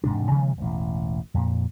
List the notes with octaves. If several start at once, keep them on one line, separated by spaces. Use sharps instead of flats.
E1 G#2 C3 D4
C3 D#3 F3 G#3
E1 A1
F2 A#2